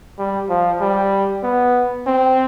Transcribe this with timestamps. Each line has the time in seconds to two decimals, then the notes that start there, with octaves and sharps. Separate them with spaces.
0.18 G3
0.49 F3
0.80 G3
1.43 B3
2.06 C4